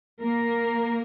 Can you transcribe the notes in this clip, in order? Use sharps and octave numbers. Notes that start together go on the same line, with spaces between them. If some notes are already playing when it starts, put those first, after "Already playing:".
A#3 A#4